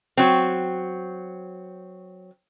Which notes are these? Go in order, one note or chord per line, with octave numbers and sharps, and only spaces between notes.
F#3 C4